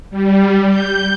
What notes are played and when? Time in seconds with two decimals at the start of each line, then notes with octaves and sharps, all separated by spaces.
0.10 G3
0.69 G6